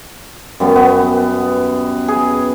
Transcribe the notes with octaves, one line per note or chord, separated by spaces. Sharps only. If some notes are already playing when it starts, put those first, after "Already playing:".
F#2 G3 B3
B3
G#4